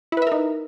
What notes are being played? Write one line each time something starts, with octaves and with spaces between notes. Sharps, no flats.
D#4 E4 A#4 B4 E5